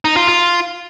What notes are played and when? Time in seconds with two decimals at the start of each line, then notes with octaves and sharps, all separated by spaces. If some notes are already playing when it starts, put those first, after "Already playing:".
0.05 D#4
0.16 F4
0.28 F4